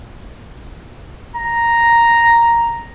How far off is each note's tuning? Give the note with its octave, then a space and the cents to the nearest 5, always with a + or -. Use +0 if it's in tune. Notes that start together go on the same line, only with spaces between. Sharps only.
A#5 +0